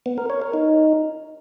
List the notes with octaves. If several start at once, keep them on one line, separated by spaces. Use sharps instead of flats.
B3
A#4
C#5
A#4
D#4